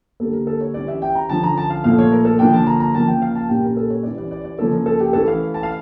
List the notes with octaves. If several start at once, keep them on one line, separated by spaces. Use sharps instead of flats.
D3 G3 A#3 A4
A#4
A4
C#5
E3 G3 C#4 D5
E5
G5
A#5
D3 F3 C#4 A5
A#5
A5
F5
A#2 F3 A3 F5
C#5
A#4
A4
D3 F3 A#3 D4 G5
A5
A#5
A#5
C#3 F3 A#3 C#4 A5
G5
F5
A5
A#2 G3 C#4 G5
A#4
A4
C#5
E3 G3 C#4 D5
D5
D5
D5
C#3 F3 A#3 C#4 A4
A#4
A4
G4
E3 A3 C#4 A4
F5
A5
F5